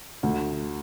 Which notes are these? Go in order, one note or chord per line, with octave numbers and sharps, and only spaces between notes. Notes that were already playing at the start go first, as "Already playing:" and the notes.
D2